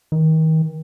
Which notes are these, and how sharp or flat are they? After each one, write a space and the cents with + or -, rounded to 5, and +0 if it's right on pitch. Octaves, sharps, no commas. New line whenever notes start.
D#3 +35